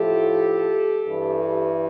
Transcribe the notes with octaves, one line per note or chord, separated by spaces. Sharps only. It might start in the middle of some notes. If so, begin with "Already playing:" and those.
Already playing: A2 F3 G4 A4
G2 E3